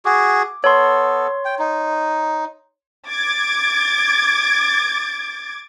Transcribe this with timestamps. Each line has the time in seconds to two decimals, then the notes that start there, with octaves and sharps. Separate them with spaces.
0.05 F#4 G#4 D6
0.64 B3 A4 C#5 C6
1.45 G5
1.59 D#4
3.08 D6 G#6 A6